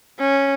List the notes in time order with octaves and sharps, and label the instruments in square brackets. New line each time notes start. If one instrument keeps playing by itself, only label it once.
[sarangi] C#4